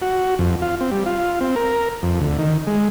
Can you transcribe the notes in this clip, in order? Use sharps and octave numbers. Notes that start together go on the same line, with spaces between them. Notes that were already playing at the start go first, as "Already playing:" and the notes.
F#4
F2
F4
C4
G3
F4
C4
A#4
F2
D2
D#3
G#3